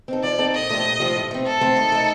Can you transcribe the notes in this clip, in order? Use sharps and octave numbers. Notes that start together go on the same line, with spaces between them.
C4 D#4 A4
F3 D5
C4 D#4 A4
A#2 D#5
F3 A3 D4 G4
A#2
F3 A3 D4 G4
A2
A3 C4
A2 A4
A3 C4
D#3
A3 D#4